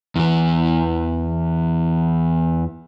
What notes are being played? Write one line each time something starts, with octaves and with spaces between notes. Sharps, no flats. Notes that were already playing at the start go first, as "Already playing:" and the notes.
E2 E3